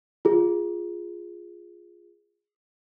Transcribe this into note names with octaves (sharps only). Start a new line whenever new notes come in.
F4 G#4